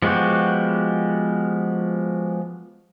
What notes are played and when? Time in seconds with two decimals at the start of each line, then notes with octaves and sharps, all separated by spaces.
0.02 F3 G#3 B3 F#4 G4